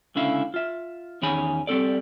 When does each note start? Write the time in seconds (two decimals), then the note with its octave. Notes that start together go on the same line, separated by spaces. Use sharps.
0.15 C#2 D3 C#4 E4 F5
0.54 F4 E5
1.22 E2 D#3 C#4 G#4 B5
1.67 G3 C4 A4 D5